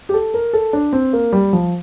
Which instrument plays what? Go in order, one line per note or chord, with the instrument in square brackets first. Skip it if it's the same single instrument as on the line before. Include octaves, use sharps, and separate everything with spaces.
[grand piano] G4
A4
A#4
A4
D4
C4
A#3
G3
F3